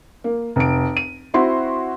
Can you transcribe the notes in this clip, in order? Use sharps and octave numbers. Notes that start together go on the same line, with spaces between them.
A#3
F1 D7
D#7
C4 E4 F#4 C6